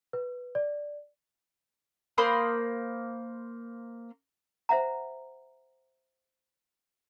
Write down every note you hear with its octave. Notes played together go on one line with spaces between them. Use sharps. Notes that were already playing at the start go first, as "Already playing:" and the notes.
B4
D5
A#3 C5 B5 D#6
C5 E5 F#5 A#5